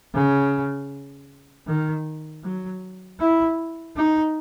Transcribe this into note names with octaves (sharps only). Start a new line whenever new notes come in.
C#3
D#3
F#3
E4
D#4